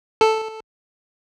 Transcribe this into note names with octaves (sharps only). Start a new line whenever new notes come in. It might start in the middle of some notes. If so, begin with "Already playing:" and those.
A4